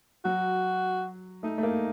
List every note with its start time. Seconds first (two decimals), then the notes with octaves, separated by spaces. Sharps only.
0.25 F#3 F#4
1.43 A3 D#4
1.58 A3
1.63 A#3